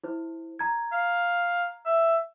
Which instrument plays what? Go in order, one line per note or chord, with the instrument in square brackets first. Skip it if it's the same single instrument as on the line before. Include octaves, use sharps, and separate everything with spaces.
[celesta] E4 C5
A#5 G#6
[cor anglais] F5
E5